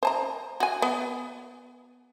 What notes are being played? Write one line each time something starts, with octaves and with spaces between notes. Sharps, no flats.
C5 A5 A#5
F#4 G#5
B3